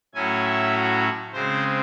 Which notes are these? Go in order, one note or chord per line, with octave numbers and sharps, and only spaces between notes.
A2 F#3 C#4 E4 G#5
E5
F#4
C#3 G#3 C4 C5